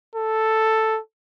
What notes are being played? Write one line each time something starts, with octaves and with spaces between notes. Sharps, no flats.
A4